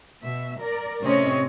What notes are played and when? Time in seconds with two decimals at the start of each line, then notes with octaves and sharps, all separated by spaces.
0.23 B2 E5
0.60 A#4 D5
1.02 A2 C3 C4 C#4 C#5 D#5